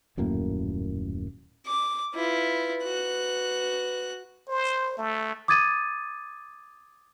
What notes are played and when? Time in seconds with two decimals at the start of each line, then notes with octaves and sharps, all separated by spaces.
0.17 D#1 F#2 A2 A#3
1.66 D6
2.15 E4 F4 B4
2.84 F#4 F#6
4.48 C5
4.97 A3
5.48 D6 D#6 G#6 A6 D#7